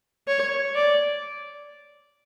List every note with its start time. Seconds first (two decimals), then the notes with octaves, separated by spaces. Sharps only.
0.27 C#5
0.75 D5